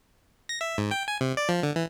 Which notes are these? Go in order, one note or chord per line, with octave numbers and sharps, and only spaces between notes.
A#6
E5
G#2
G5
G#5
C3
D5
F3
D3
E3